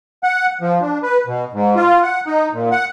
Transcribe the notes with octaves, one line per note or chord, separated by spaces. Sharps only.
F#5
F3
D4
B4
B2
G#2
F4
F#5
D#4
A#2
F#5